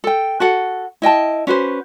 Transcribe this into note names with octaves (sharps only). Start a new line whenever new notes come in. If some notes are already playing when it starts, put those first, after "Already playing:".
A4 G5
F#4 A4 F#5
E4 D#5 G5 A5
C#4 F#4 B4 C5